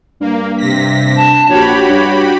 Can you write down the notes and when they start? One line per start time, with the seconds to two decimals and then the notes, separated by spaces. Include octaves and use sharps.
0.21 G2 A#3
0.57 C3 A#6 B6
1.16 A5
1.49 A#1 F#4 G4 C#5 B5
1.89 G2